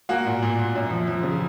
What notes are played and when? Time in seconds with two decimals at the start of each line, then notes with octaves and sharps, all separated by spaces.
0.09 A#3 F#4 F#5
0.26 A#2
0.42 A#2
0.58 A#2
0.75 F#2
0.90 F3
1.07 F3
1.23 C#3